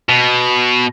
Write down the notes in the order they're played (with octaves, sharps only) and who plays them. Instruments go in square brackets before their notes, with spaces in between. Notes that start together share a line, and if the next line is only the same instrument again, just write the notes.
[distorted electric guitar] B2